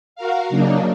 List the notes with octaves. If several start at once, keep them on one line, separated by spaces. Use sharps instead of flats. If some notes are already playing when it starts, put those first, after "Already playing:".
F#4 A#4 F5
C#3 F#3 A#3 D4 D#4